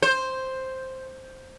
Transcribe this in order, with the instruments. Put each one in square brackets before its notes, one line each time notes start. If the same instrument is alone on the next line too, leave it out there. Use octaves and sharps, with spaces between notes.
[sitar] C5